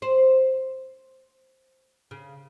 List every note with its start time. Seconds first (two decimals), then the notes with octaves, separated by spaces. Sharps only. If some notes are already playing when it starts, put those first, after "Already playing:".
0.02 C5
2.11 C#3